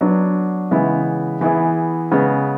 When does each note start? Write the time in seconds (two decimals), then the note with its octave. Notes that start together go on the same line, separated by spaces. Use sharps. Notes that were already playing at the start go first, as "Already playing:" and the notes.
0.01 F#3 B3 D4
0.71 C#3 E3 G#3 B3 E4
1.41 E3 B3 E4 G#4
2.11 C#3 G#3 B3